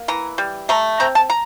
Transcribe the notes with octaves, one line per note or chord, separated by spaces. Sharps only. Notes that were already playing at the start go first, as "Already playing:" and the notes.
Already playing: A#3
E3 A#5
G3
A3 A#5
C4 A#5
A5
A#5